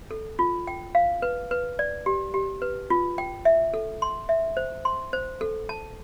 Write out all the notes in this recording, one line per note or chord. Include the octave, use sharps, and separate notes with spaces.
A4
F4
G5
F5
B4
B4
D5
G4
G4
B4
F4
G5
E5
A4
C6
E5
C5
C6
C5
A4
A5